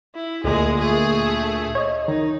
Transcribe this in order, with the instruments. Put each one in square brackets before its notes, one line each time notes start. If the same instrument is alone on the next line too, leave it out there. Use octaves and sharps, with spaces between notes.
[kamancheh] E4
[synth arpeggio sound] D2 A#2 [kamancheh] G#3 G#4
[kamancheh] A3 G#4
[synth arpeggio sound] C#5 D#5
[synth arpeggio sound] D#3 [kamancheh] D#4